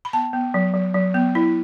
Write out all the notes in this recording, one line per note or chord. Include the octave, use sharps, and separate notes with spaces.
B5
B3 A5
B3
F#3
F#3
F#3
B3
E4